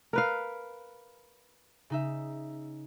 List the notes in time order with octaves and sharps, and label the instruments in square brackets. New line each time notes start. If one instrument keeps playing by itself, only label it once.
[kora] A#4 B4 F5
[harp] C#3 D#4 E5